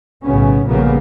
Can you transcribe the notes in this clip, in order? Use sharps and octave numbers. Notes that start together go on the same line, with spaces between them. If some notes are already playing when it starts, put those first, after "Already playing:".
B1 A2 C#3 F#3 B3 C#4
A#1 A#2 C#3 G3 A#3 B3